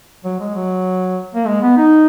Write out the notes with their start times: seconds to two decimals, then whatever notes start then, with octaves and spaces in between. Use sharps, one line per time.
0.24 F#3
0.40 G#3
0.55 F#3
1.35 A#3
1.46 G#3
1.62 B3
1.77 D#4